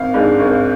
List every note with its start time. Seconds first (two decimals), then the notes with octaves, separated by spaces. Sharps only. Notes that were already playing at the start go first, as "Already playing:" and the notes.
Already playing: G#1 F5
0.14 G#2 G#3 D4
0.40 G#1